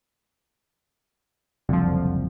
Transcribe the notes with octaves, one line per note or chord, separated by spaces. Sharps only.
F#1 C2 F2 D3 F3